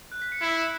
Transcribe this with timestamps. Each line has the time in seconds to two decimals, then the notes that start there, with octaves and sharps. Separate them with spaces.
0.12 F#6
0.22 B6
0.32 C#7
0.41 E4 B6
0.55 C#7